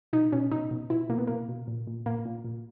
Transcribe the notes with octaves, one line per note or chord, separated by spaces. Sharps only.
B2 D#4
B2 C#4
B2 D#4
B2
B2 E4
B2 A#3
B3
B2 A#3
B2
A#2
A#2
A#2 A#3
A#2
A#2